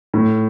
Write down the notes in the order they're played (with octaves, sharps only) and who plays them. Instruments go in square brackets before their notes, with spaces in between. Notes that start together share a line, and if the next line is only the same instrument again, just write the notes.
[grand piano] A2